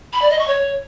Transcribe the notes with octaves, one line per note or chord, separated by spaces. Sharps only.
B5
D5
D#5
C#6
C#5